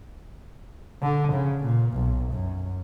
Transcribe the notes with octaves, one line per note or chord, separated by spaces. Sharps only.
D3
C#3
A#2
B1
F#2